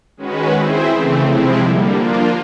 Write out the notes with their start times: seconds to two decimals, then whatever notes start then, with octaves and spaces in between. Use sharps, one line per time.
0.17 D#3 G#3 C#4 F#4 B4
0.53 C4 E4 G#4 C5 E5
0.88 C#3 E3 A3 C4
1.23 C3 F3 G#3 C4 E4
1.59 D3 G3 A#3
1.94 F3 A#3 D4 F4